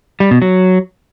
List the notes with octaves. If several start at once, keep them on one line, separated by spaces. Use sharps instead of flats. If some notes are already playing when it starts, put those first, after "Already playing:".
G3
B2
F#3